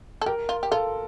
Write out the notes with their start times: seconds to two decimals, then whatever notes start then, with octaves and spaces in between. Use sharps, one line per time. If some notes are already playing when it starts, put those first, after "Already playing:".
0.22 A4
0.26 G4 A#4
0.49 F4
0.63 G4
0.71 F4 A4